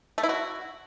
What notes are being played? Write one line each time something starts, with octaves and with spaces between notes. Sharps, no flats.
A3
E4
F#4